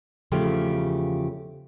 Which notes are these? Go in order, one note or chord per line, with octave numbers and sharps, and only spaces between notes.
E2 C#3 F3 A3 G4